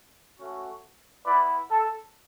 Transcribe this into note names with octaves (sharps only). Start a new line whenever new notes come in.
A3 C#4 F#4
B3 E4 B4 D5
A4